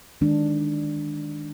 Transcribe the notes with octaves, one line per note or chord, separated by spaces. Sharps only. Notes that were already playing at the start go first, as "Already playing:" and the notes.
D#3 G#3 D4